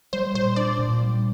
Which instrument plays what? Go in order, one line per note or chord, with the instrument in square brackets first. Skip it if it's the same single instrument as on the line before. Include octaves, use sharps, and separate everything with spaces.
[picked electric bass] G3 [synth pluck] C5
[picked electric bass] A#2 [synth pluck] C5
[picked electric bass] D4 [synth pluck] D5
[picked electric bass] A#2
G3